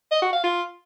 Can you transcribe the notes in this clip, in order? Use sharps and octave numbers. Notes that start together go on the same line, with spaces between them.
D#5
F#4
F5
F4